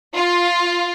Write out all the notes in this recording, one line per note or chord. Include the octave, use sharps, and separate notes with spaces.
F4